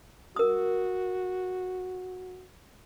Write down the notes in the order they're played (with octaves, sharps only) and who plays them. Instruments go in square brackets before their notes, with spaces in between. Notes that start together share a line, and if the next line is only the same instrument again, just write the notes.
[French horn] F#4 [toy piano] A#4 D#6